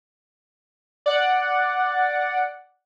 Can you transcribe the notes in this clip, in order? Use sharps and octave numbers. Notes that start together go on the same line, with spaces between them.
D5 F#5